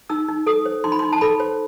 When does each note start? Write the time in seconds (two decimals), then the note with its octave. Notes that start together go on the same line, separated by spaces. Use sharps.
0.10 D#4 E6
0.28 D#4
0.47 A4 D#6
0.65 C5
0.84 D#4 C6
0.92 B5
0.99 D#4 C6
1.12 A5
1.21 A4 B5
1.40 C5